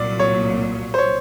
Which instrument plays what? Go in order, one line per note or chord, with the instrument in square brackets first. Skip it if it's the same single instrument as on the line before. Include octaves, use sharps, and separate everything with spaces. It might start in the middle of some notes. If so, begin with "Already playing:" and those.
Already playing: [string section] C2 A#2 F#3 [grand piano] D5
[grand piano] C#5
C5
C#5